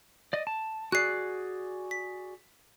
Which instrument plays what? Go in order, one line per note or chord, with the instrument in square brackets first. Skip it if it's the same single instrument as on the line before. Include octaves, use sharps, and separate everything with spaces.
[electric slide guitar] D5 D#5
A5
[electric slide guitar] F#4 G#4 D5 [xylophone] F#6 C7
[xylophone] B6